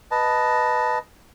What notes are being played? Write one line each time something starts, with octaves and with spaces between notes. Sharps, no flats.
B4 D#5 A5